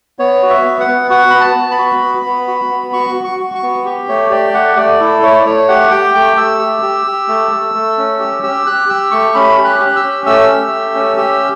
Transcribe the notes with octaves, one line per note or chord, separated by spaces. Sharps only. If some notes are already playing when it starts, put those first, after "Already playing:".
B3 C#5
F#4
E5
B3
F#5
B3
F#4 F#5
B3 B5
A5
B3
B5
F#4
B3
B3
F#4
B3
F#4 C#6
F#4
C#6
F#4
C#6
B3
G4
A3 C#5
G4 D5
A3 F#5
A3 D5
E4 A4
A3 C#5
D5
A3 C#5
G4 F#5
G4 G5
A3 G5
A3 E6
G4
G4
G4
A3
A3
A3
C#4
G4
G4 E6
G4 F#6
G4 E6
A3 C#6
C#4 B5
G4
F#6
G4
E6
C#4
A3 E6
G4
A3
C#4
G4 E6